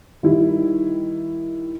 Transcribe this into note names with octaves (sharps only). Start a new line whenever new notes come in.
D#3 G3 E4